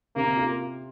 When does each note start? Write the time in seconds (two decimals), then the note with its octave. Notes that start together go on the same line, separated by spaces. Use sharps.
0.16 C3 A#3
0.37 F4